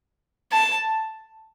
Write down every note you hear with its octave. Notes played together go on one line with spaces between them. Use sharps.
A5